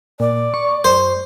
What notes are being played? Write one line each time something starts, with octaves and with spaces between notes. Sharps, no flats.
A#2 D5
C#6
F#2 C5